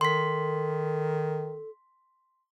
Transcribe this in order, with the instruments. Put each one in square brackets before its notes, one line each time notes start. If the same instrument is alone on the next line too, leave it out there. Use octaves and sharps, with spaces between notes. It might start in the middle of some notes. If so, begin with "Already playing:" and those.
[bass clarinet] D#3 [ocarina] A4 [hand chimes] C6 B6